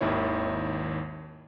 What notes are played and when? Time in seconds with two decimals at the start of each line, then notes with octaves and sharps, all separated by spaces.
0.01 G#1 D#2 D#3 E4 C#5